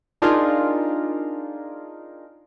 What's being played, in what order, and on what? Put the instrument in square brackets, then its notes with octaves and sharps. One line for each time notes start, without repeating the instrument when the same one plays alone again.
[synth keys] D4 D#4 F4 G#4 A#4